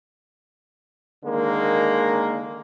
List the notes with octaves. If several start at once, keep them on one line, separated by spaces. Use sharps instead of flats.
D3 D#3 G#3 A#3